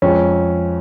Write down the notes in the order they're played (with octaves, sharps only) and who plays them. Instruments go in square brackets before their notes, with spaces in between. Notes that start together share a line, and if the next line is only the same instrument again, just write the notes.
[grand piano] F2 F3 G#3 C#4